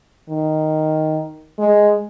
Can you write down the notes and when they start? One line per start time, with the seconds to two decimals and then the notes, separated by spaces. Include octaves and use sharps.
0.29 D#3
1.59 G#3